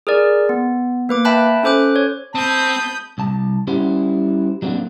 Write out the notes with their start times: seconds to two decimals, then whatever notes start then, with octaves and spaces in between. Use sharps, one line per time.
0.07 G#4 A#4 D5
0.49 B3
1.09 A#3 B4 D6
1.25 E5 G5 A5 B5 F#6
1.63 C#4 A4 C5 D6 F#6
1.96 C#5
2.35 C4 A5 B5 D#6 G6
3.18 C2 A5
3.67 G3 C#4 E4 F#4 G4 C5
4.62 F#3 G3 A#3 C4 D4 F#4